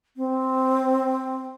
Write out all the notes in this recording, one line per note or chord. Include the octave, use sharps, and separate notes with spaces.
C4